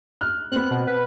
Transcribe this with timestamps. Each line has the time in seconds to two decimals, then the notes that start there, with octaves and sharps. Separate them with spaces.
0.21 F6 F#6
0.52 B3 C4 F#6
0.71 B2
0.87 B4